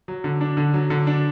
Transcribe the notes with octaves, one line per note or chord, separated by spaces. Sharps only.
F#3
D3
D4
D3
F#3
D3
D4